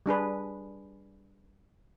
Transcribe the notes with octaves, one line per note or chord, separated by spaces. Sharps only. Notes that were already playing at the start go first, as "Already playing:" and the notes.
G3 D4 G#4 B4